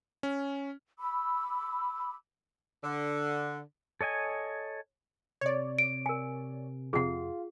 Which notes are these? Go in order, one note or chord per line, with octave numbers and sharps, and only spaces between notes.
C#4
B5 D6 E6
D3
A4 C#5 D#5 G#5
C3 C#5 D5
D7
A#4 G#5
F2 C3 F4 G#4 F#5